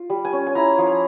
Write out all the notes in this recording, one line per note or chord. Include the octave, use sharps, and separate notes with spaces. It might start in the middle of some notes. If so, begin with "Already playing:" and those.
Already playing: F4
G3
G#5
C#4
G#5
E4 A#5
F3
A#5